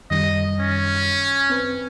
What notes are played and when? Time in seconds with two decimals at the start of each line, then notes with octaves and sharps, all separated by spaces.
0.11 F#2 D#3 G3 D#5
0.60 C#4
1.50 C4 B4